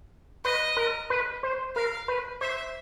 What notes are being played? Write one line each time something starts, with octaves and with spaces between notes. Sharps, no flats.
B4 D#5
A#4
B4
C5
A#4 F5
B4
C5 E5